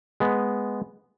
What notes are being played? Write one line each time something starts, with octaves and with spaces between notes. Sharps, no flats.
G#3 B3